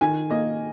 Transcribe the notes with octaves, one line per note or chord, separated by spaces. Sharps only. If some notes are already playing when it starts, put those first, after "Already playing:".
D#3 G#5
A#3 D#5